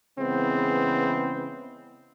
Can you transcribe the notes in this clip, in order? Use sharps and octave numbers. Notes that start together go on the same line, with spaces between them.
C#3 E3 G#3 B3 C4